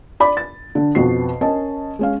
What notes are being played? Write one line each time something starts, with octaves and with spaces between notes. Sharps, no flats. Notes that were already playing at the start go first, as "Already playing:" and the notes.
D5 B5 D6
A6
D3
F2 B2 B3 F#4 C7
C#4 A#4 D#5 A5
G#3 C#4 F5